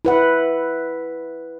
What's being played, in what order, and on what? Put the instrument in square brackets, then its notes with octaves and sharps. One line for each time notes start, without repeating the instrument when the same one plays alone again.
[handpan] E4 B4 F#5